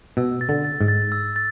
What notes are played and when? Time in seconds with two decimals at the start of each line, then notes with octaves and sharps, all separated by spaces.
0.17 B2 E6
0.41 A6
0.49 D3
0.65 A6
0.81 G#2
0.88 A6
1.12 E6
1.36 A6